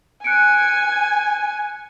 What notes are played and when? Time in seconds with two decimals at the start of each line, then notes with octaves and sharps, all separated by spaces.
0.24 G#5 F#6 C#7 D7